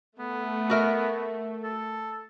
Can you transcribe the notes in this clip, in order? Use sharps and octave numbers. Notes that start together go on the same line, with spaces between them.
A3 B3
F#4 A#4 E5
A4